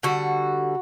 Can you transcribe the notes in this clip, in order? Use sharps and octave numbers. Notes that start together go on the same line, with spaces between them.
D3 G3 F#4